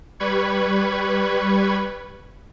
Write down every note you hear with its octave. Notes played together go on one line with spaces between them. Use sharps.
G3 B4 B5 C#6 G#6